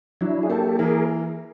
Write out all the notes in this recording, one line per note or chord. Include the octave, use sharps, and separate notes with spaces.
F#3 D4 E4
G#4
A#3 G4 A4
E3 G#4 A#4